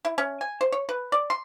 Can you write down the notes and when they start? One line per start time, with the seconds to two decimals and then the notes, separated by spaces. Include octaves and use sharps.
0.05 E4
0.18 C#4
0.41 G#5
0.61 C5
0.72 C#5
0.89 B4
1.12 D5
1.30 C6